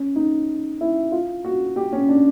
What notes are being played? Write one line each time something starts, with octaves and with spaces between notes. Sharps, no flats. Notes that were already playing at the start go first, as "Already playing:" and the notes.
Already playing: C#4
D#4
E4
F4
F#4
G4
C#4
D4